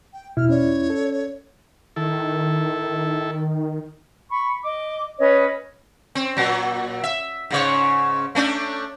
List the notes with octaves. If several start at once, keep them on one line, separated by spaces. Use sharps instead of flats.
G5
E2 B2 E4 F6
C#4 C#5 D5
A4
D#3 E4 A4
B5 C#6
D#5 D6
C#4 B4 C#5 D#5
C4
A#2 F#3
E5
G#2 C#3 C#5
A3 C#4 D4